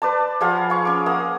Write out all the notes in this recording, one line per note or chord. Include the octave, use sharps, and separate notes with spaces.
B4 D5 A5
F3 G#4 F5 F#5
F5 C#6
C#4 D6
A#3 F#5 D#6